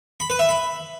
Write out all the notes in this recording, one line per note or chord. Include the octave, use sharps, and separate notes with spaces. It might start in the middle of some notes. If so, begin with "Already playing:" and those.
B5
B4
E5
B5